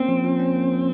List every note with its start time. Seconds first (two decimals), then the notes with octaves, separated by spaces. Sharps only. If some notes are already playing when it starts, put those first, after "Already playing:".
Already playing: A#3 C4 C#4
0.08 F3
0.24 F3
0.40 C#4
0.56 A#3
0.71 F3